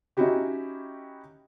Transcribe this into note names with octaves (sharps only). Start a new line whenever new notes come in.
C#4 D#4 E4 F#4 G4